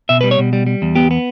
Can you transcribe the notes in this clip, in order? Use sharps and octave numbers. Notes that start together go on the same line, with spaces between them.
B2 E5
B4
G3
C#5
B2
G3
G3
E2
B3 G4
B3